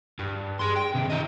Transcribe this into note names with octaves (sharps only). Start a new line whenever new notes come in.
G2
G#4 C6
G5
C3 D#3
E4 D#5